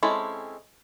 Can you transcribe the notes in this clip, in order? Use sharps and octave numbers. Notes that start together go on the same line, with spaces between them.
G#3 C4 C#4 E4 A4